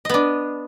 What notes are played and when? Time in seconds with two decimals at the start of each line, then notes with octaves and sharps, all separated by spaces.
0.05 D#5
0.09 B3
0.14 D4